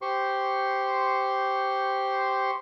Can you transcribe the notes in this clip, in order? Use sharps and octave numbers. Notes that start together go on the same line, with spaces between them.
G4 C5 C6 C#6